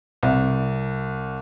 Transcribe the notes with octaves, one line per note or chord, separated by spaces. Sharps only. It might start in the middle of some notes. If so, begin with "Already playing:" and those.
C2